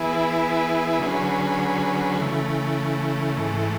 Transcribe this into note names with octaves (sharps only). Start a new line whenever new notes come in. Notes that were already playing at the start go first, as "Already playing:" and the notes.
Already playing: E3 B3 E4 G#4 B4
D3 F#3 C#4 G#4 B4
C#3 E3 A3
G#2 E3 A3